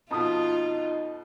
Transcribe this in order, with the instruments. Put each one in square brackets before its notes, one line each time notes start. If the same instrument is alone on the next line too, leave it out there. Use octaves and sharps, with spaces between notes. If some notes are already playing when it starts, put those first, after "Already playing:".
[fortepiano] F2 B2 [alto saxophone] D#4 [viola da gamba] F4 [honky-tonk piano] A5 D#6